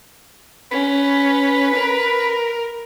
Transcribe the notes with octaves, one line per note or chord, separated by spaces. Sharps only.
C#4 B4
A#4